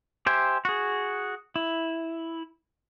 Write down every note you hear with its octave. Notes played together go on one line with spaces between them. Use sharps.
G4 C5 E5 G5 G#5
F#4 G#4
E4